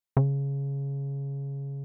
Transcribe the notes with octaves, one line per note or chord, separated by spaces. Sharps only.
C#3